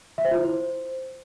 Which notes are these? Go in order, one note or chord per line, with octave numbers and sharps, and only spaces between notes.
E5
C5
F4
E4
C5